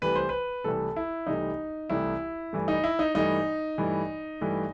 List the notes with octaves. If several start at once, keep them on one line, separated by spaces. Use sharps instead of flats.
C2 C3 E3 A3 B4
C5
B4
C2 C3 E3 A3 A4
E4
C2 C3 E3 A3 D#4
C2 C3 E3 A3 E4
G2 E3 A3
D#4
E4
D#4
G2 E3 A3 D#4
G2 E3 A3
G2 E3 A3